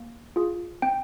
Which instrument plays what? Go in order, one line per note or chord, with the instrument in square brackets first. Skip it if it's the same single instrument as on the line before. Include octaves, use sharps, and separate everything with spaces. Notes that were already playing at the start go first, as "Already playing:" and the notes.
Already playing: [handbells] A#3
F4 G#4
C4 G5